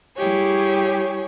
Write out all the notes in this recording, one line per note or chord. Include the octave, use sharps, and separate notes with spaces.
G3 E4 G4 G#4 C#5